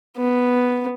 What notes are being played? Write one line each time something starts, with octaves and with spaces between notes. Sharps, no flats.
B3